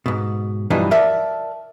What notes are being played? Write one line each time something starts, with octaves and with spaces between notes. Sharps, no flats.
G#2 B2
G2 B2 E3 F3 D4 D#4
A#4 D5 E5 A5